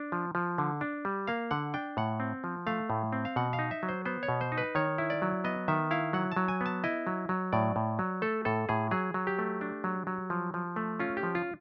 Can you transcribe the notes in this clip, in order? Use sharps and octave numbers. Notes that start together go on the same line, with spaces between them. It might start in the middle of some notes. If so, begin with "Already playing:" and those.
Already playing: D4
F3
F3
D3
D4
G3
A#3 F5
D3 F#5
D4 G5
A2 F#5
C4
F3
A3 F5
A2
C4
F5
B2 F#5
F5
D#4
E5
F#3
C5
B3 C5
C#5
B2
C5
D#4
B4
D#3 C#5
E4
D5
F#3
B3 D#5
D#3 E5
E4 F5
F#3 F#5
F#3 A5
G#5
B3 A5
E4 D#5
F#3
F#3
A2 D5
A2
F#3
A3 A4
A2 A4
A2 G#4
F#3 G#4
F#3
G4
A3
D4
F#3
F#3
F3
F3
A3
C#4 F4
G4
F3
F4